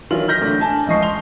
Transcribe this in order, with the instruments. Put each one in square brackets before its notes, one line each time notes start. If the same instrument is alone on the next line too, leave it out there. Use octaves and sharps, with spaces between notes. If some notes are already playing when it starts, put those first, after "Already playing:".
[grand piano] D#3 E3 F#3 F4 F#7
F6 G6 A#6 B6
A2 D3 D5
D4 G#5 A5
C#2 E3 F3 D#5 C#6 C7
C6 F7 G7